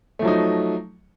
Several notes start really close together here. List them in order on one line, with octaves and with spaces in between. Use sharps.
A3 F3 F#3 D#4